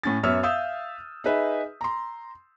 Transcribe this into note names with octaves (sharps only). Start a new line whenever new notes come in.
A2 C#4 A6
F#2 B3 C#5 E5 E6 F6
E5 F5 D#6 E6 G6
D#4 G#4 B4 E5
A#5 C6